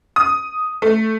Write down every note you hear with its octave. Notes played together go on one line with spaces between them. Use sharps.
D#6
A3